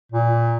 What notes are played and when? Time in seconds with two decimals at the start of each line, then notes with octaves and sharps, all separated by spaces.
0.12 A#2